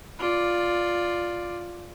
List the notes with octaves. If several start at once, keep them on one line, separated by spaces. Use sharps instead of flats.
F4 D5